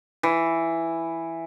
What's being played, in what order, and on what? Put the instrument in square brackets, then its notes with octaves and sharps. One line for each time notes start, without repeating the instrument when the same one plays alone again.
[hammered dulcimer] E3